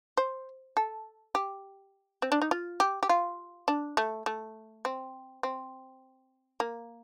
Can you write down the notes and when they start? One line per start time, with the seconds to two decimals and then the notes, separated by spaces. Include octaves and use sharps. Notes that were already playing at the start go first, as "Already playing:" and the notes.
0.17 C5
0.77 A4
1.35 G4
2.22 C4
2.32 D4
2.42 D#4
2.51 F4
2.80 G4
3.03 G4
3.09 F4
3.68 D4
3.97 A3
4.26 A3
4.85 C4
5.43 C4
6.60 A#3